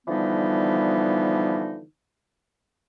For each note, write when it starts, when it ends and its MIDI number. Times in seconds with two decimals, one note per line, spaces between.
0.08 1.82 50
0.08 1.82 52
0.08 1.82 53
0.08 1.82 55
0.08 1.82 59
0.08 1.82 63